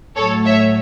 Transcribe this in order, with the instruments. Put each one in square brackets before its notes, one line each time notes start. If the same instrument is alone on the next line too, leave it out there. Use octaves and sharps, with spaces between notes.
[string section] A2 F#3 A4 C#5
C#5 E5